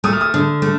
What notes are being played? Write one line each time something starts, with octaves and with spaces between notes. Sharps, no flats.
A3 D#6
F6
D#6
D3
A3